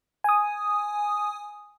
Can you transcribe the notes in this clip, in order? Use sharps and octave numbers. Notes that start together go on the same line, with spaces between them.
G#5 D#6